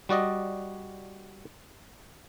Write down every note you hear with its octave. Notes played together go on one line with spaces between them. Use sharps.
G3 F#4 D5 D#5